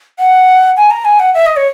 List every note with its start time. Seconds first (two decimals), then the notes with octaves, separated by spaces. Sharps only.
0.19 F#5
0.77 G#5
0.91 A#5
1.05 G#5
1.20 F#5
1.34 E5
1.46 D#5
1.57 C#5